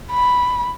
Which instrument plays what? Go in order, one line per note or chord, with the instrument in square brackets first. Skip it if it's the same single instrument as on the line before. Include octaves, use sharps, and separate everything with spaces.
[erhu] B5